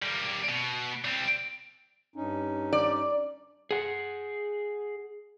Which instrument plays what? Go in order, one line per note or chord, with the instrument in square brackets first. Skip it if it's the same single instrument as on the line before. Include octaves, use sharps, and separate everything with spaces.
[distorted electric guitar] G3 A#3
B2
G3 C4
[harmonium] G2 C#4 D#4
[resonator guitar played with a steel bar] D5
[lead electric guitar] G#4 F#5